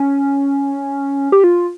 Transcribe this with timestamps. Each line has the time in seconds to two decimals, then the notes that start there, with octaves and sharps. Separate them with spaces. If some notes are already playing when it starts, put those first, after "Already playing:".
Already playing: C#4
1.32 G4
1.44 F4